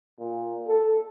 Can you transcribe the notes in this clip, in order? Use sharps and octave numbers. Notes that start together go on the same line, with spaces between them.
A#2
A4